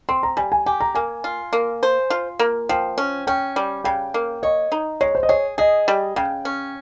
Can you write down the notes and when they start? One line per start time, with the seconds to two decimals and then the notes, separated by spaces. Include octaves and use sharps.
0.09 C4 C6
0.23 A#5
0.37 G3 G#5
0.52 G#5
0.66 G4 G#5
0.81 A#5
0.95 A#3 G#5
1.24 F4
1.53 A#3
1.83 C5
2.10 F4
2.39 A#3
2.69 F3 G5
2.98 C#4
3.27 C#4 G5
3.56 G3
3.84 C#3 G5
4.14 A#3
4.43 C#5 D#5
4.72 D#4
5.01 G#3 C#5
5.15 C5
5.23 D#5
5.29 G#4 C#5
5.58 G#4 D#5
5.88 G3
6.16 C#3 G5
6.45 C#4